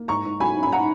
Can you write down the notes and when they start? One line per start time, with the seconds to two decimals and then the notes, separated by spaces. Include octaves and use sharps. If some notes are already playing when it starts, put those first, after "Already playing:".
Already playing: A#3
0.08 G#2 A#5 C#6
0.25 G#2
0.40 F#3 G#5 B5
0.57 C#4
0.63 B5
0.72 F#5 A#5